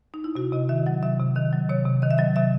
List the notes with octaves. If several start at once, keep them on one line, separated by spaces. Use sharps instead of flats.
D#4
E4
C3 F#4
C3 D#5
D#3 E5
F#3 F#5
C3 E5
C3
D#3 D#5
F#3
C3 C#5
C3
D#3 D#5
E5
F#3 D#5
C3 E5